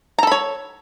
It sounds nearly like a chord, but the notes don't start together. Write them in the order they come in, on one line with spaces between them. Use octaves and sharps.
A#5 A4 B5 C#5